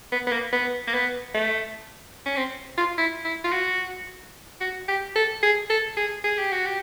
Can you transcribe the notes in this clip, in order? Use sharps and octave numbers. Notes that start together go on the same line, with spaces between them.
B3
B3
A#3
B3
A#3
B3
A3
C#4
C4
F4
E4
E4
F4
F#4
F#4
G4
A4
G#4
A4
G#4
G#4
G4
F#4
G4